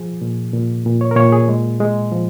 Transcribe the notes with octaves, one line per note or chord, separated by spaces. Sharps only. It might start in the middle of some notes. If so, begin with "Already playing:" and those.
Already playing: F3 G#4
A#2
A#2
A#2
C#5
A#4
A#2 C#5
G#4
G#3
G#3
F3